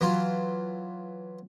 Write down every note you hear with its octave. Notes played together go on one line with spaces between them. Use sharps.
E3 F#3 F4